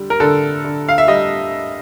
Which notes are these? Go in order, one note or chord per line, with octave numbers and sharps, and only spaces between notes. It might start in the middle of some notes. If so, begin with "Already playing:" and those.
Already playing: D3 G3
A#4
D3 A4
D3
F5
E5
G3 D#5